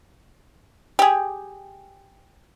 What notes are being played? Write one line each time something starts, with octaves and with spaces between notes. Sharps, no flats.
G4 G#4